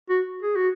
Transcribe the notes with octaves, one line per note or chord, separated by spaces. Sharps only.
F#4
G#4
F#4